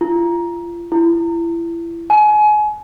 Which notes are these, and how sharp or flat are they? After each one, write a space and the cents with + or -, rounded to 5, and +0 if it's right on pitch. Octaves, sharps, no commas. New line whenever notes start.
F4 -30
E4 +30
G#5 +30